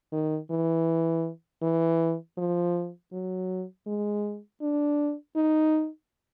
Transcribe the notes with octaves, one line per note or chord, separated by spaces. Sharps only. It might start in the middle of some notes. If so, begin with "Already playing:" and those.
D#3
E3
E3
F3
F#3
G#3
D4
D#4